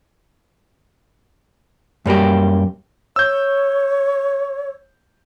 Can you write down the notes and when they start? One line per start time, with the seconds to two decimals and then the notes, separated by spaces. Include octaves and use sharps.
2.06 F#2 G3 A#3 G4
3.16 C#5 E6 G6